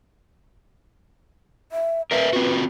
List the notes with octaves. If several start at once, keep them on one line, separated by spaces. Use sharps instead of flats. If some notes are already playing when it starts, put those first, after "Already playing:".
E5
A#4 B4 D#5 E5
C4 F4 F#4